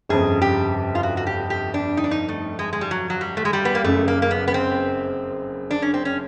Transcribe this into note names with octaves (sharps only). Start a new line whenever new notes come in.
G1 F2 C#3 G#4
G4
F4
F#4
F#4
G4
G4
D4
D#4
D4
D#4
A3
G#3
G#3
G3
F#3
F#3
G3
A3
G#3
G3
B3
A#3
F#1 F#2 C#3 A3
A#3
A#3
B3
B3
C4
D4
C#4
C4
C#4